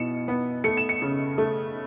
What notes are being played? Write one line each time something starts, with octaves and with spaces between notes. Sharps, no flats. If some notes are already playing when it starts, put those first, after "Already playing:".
Already playing: B2 E4 C#7 E7
B3
A3 C#7
E7
C#7
C#3
A3